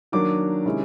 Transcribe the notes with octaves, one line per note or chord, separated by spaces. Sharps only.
D#3 F#3 A#3 D4 D6
C3 D#3 G#3 C#4 E4